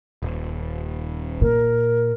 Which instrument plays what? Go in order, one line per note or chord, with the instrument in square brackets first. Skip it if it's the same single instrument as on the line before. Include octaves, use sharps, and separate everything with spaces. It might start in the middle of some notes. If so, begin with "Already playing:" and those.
[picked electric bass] D#1
[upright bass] A#2 [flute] A#4